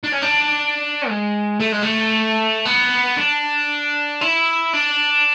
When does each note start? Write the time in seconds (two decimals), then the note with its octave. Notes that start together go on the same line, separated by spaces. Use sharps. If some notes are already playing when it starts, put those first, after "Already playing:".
0.04 D4
0.13 C#4
0.22 D4
1.09 G#3
1.60 A3
1.72 G#3
1.82 A3
2.65 B3
3.17 D4
4.21 E4
4.73 D4